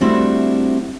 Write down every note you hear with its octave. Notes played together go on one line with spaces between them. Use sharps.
G3 A3 C4 D4 E4 F#4